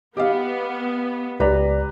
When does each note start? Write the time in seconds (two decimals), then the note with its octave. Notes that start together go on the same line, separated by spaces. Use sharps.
0.17 B3 G4 D#5 F5
1.40 C#2 G4 B4 D5 A#5